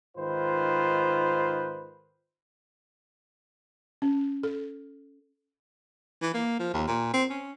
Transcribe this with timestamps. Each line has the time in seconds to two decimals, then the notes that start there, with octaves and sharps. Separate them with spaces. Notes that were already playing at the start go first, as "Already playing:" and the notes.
0.17 G#2 D#3 F4 B4 C5
4.02 C#4
4.43 A4
6.22 E3
6.34 A#3
6.60 F3
6.73 D#2
6.88 A#2
7.14 C4
7.30 C#4